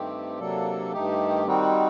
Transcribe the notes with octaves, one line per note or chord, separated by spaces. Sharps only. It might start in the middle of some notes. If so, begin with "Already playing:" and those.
Already playing: G2 D#3 A3 C4 G4
C3 F#3 A#3 D4 A4
G2 D#3 A3 D#4 G4
D#3 G3 C4 D#4 F#4